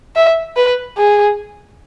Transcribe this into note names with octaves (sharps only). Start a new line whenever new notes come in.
E5
B4
G#4